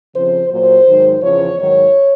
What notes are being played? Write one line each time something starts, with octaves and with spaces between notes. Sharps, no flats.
F2 C#3 F3 C5
A#2 F#3 C5
G#2 D#3 F#3
E2 C#3 F3 C#5
G#2 D#3 F#3 C#5